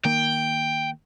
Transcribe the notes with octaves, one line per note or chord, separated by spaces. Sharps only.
D#3 A#3 G5